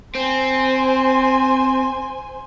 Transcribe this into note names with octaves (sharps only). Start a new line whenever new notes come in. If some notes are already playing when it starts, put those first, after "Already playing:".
C4 C5 G#5